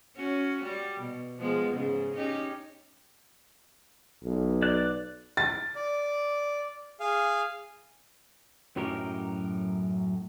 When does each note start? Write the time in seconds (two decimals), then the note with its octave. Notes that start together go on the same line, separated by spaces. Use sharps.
0.16 C#4 F#4
0.64 G3
1.00 B2
1.39 F3 G#3 B3
1.72 G#2 C#3
2.14 C#4 D#4 G4
4.23 B1
4.62 D5 F#6
5.37 A6
5.75 D5
7.00 G#4 F5
8.76 F#2 A2 F#3 D#4 G4 A#4